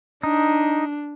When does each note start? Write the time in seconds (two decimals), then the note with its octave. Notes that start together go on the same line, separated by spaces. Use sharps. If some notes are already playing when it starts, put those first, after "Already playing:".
0.23 D4 D#4